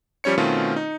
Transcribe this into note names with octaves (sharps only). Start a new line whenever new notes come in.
F3 G3 C#4 C#5 C#7
B2 D#3 A3 C4 C#4 F4
D#4